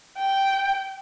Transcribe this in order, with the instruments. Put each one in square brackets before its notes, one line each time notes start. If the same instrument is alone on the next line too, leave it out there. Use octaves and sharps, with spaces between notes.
[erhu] G5